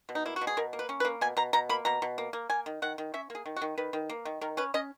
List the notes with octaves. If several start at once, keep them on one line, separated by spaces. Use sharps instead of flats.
B2
D#4
A#3 E4
F#4
B2
G#4
B2 A#4
A#3
B4
C#4
B4
A#3
B2 G#5
B2 A#5
B2 A#5
A#3 B5
B2 A#5
B2
A#3
A#3
A#3 G#5
D#3
D#3 F#5
D#3
C#4 E5
A#3 G#4
D#3
F#4
D#3
D#3 B4
D#3
A#3
D#3
D#3 A#4
C#4 B4
C#4 D#5